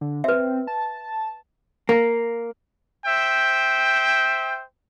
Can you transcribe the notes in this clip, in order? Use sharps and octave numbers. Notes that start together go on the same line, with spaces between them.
D3
C4 B4 E5
A5
A#3
C5 E5 G5